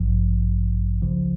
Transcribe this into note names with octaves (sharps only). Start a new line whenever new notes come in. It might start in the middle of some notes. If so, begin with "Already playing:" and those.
Already playing: A1 G2 F3
C#2 C#3 F3